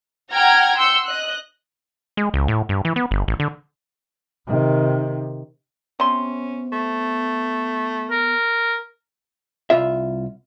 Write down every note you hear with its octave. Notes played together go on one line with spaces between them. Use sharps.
F#5 G5 A#5 F6 G#6 A#6
C6 E6 G6 C#7
D#5 F#6
G#3
C#2
A2
G2
E3
B3
G1
A1
D3
C3 D#3
C3 B3 C#4 C6
A3
A#4
C2 F4 E5